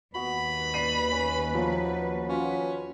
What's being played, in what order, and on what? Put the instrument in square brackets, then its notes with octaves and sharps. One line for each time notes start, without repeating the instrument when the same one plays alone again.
[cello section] D#2 B4 [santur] B3 F#4 [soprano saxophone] B5
[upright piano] D5 C7 D#7
[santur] C#4
[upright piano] F3 [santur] F#3 F#5
[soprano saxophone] C#4 [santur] F4 F#4